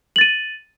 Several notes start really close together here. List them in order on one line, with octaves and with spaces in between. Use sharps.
F#7 A6 D#7